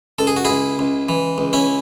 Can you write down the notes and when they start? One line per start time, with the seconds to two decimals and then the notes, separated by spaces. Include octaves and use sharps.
0.19 C#2 A4
0.27 G#4
0.37 F#4
0.45 C#2 E4 G#4
0.79 C#2
1.09 E3
1.38 C#2
1.53 C#4 E4